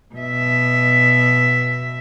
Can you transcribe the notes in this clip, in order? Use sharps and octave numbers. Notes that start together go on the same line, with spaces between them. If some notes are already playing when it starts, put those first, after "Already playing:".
B2 E5